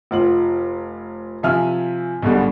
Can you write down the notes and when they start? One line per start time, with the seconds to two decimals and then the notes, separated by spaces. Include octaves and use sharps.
0.11 F1 F4 F#7
1.43 C3 F3 E5 G#5 F6
2.23 B1 B2 D3 G3 G#3